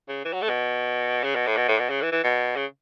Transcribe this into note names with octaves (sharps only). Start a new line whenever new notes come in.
C#3
E3
F#3
A3
B2
C#3
B2
A2
B2
A2
B2
C#3
E3
E3
B2
C#3